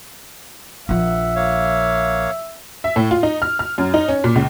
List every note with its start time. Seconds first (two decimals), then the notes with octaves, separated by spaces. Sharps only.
0.89 A#1 F3 E5 F#5
1.35 A#3 C#5 F5
2.84 E5
2.96 A2
3.11 F4
3.23 D#4
3.42 F6
3.59 F6
3.78 F#2
3.94 D#4
4.08 C#4
4.24 A#2
4.36 C#2